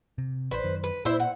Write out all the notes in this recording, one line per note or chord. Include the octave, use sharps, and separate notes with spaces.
C3
A1 B4 C5
F#2 D#3
B4
A#2 E4 C5 E5
F#5